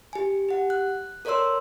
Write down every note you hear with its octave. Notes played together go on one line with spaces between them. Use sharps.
G4 G#5
G4 F#5
F#6
A4 A#4 C#5 D5 C6 E6